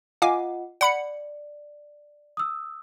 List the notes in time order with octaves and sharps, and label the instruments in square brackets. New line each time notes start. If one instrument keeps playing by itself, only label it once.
[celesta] F4 D#5 F#5 [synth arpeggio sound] F5 G#5 D6
[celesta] D5 [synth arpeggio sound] F#5 B5 C#7
[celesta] D#6 E6